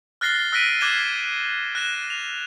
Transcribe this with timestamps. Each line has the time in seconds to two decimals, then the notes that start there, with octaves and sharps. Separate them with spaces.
0.21 F6 F#6 A6 A#6 C7 G7
0.52 E6 F#6 A#6 B6 D7 D#7
0.81 D6 F#6 G#6 C7 E7 G7
1.75 F#6 A#6 E7
2.10 F7